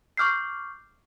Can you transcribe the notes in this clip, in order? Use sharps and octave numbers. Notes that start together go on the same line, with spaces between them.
C#6 D6 F6 G6 C7